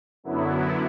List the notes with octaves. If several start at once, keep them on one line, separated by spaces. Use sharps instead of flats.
F#2 D3 F#3 B3 E4